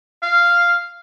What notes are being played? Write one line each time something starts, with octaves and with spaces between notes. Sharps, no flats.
F5